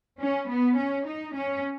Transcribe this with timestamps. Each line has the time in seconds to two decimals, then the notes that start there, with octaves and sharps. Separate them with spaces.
0.20 C#4
0.48 B3
0.77 C#4
1.06 D#4
1.35 C#4